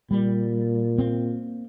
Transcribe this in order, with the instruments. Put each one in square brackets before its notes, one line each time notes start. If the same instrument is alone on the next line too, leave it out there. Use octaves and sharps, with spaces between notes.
[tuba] A#2 [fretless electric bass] G3
[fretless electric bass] A#3 C4